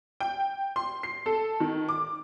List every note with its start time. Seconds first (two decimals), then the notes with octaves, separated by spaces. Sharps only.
0.20 G5
0.76 C6
1.03 C7
1.26 A4
1.60 D#3
1.89 D6